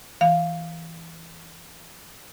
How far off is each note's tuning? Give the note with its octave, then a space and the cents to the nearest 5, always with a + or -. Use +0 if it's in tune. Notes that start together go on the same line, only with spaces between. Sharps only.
E3 +0 F5 +0